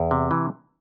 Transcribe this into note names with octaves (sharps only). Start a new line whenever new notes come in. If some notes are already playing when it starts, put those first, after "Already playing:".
Already playing: E2
C3
E3